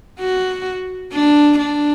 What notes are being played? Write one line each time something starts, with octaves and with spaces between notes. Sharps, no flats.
F#4
D4
D4